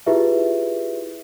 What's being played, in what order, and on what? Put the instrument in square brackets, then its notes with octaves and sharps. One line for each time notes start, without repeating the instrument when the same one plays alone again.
[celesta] E4 F4 G4 G#4 B4 E5